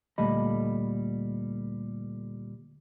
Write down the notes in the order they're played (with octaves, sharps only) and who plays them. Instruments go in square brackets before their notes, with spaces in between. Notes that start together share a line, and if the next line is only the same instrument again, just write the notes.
[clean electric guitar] D2 A#2 G3 A3 D#5 B5